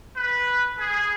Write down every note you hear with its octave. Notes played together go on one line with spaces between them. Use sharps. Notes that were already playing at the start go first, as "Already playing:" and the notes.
B4
G#4